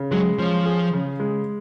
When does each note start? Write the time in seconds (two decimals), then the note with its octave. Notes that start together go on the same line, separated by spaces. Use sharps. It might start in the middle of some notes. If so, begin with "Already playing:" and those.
Already playing: C#3
0.11 F#3 G#3
0.38 F3 C#4
0.65 G#4
0.93 C#3
1.20 G#3